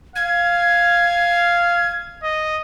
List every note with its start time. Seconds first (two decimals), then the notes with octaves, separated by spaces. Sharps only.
0.16 F5 G#6
2.23 D#5